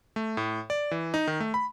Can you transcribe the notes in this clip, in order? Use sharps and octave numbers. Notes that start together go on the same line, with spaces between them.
A3
A2
D5
E3
D#4
D#3
A3
B5